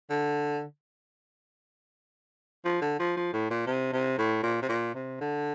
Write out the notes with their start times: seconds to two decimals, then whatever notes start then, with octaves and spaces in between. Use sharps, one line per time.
0.10 D3
2.65 F3
2.82 D3
2.99 F3
3.16 F3
3.33 A2
3.50 A#2
3.67 C3
3.93 C3
4.18 A2
4.43 A#2
4.62 C3
4.69 A#2
4.94 C3
5.21 D3